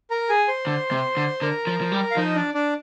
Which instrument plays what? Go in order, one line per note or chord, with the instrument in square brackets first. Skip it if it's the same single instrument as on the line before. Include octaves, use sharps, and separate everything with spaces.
[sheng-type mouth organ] A#4 A#5
G#4 G#5
C5 C6
[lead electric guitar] D3
C3
D3
[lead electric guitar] D3 [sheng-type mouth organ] A#4 A#5
[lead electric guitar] F3
F3
G3
[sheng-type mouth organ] F5
[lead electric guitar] F3 [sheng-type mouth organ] D#4 D#5
[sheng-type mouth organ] D4 D5
D4 D5